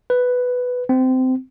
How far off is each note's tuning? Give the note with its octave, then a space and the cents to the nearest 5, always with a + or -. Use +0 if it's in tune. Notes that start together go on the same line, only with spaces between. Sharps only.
B4 +5
C4 -20